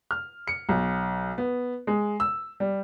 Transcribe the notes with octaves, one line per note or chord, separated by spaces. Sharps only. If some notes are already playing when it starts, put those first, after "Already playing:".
F6
C#7
B1
B3
G#3
E6
G3